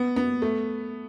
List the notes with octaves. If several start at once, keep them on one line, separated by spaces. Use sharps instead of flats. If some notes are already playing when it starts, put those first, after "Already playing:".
Already playing: B3
B3
A3